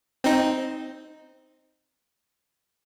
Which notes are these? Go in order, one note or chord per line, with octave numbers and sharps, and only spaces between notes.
C4 D#4